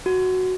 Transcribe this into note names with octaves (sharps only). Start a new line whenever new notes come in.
F#4